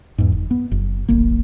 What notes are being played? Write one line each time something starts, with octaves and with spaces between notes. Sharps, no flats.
E2 G#2
F#1
B3
F#1
D1 G#1 A#3